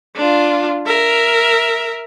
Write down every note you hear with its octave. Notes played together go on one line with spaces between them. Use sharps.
D4 F4
A#4 E5